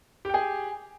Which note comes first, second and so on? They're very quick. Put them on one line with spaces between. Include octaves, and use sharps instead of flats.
G4 G5 G#4